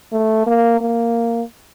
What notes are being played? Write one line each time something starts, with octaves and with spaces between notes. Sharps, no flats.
A3
A#3
A#3